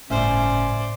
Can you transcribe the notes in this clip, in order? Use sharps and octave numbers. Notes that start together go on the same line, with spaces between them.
G1 C#2 A2 C#4 C5 D5 E5